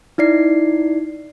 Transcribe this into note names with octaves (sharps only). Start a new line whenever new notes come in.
D#4 E4 D5 C7